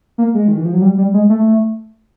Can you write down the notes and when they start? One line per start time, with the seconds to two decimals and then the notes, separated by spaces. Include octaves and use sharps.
0.18 A#3
0.34 G#3
0.48 D#3
0.57 E3
0.65 F3
0.73 F#3
0.82 G3
0.98 G3
1.14 G#3
1.29 A3